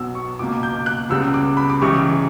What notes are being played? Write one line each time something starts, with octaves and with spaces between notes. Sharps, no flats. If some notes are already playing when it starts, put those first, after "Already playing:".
Already playing: B1 B2 F#3 B3 E6
C#6
C#2 B2 A#3 D6
G6
G6
F#6
C#2 C#3 G3 B3 E6
D6
B5
D6
C#2 C#3 E3 G3 C#6